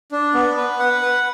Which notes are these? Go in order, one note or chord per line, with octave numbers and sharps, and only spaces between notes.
D4
B3
B4
F#5
B4